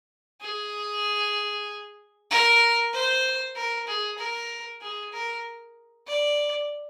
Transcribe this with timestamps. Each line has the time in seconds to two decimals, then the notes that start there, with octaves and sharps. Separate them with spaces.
0.42 G#4
2.30 A#4
2.93 C5
3.56 A#4
3.88 G#4
4.18 A#4
4.82 G#4
5.13 A#4
6.07 D5